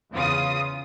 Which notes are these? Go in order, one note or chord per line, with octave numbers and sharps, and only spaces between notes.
E2 C#3 F4 D#6